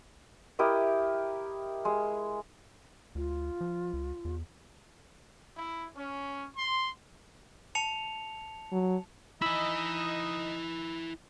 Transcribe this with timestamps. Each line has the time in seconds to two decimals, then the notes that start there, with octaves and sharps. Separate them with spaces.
0.59 E4 G4 A#4 D#5
1.85 G#3
3.15 D2 F4
3.61 F3
3.93 C#2
4.25 E2
5.56 E4
5.95 C#4
6.57 C6
7.75 A5 C#7 F7
8.72 F#3
9.42 D#4 E4 D#5 G#5 B5 E6